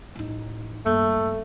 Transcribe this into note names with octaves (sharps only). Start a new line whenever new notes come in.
A1 D#4
G2 A3 A#3